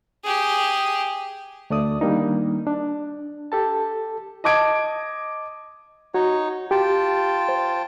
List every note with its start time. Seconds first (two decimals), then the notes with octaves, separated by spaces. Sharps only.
0.24 G4 G#4
1.70 D2 A3 D5 D#6
2.01 D#3 G3 A#3 D4 D#4
2.67 D4
3.52 G4 A4 A5
4.44 D#5 A5 D6 G#6 D7
6.14 D#4 F#4 C#5
6.71 F4 G4 G5 A5
7.49 C5